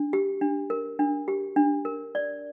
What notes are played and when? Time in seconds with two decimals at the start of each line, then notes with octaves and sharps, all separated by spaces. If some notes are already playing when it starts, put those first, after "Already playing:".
Already playing: D4
0.13 G4
0.41 D4
0.70 A#4
0.99 D4
1.28 G4
1.56 D4
1.85 A#4
2.15 D5